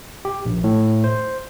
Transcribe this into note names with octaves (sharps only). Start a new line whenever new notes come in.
G4
A#1
A2
C5